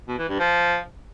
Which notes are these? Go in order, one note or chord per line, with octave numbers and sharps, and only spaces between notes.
B2
E3
G2
F3